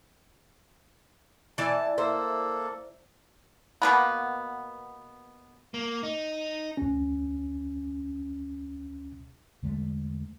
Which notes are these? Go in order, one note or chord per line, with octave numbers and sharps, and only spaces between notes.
E3 D5 A5
A#3 A4 C5
B2 A#3 B3
A#3
D#4
D2 C#4
E2 D3 G#3 A3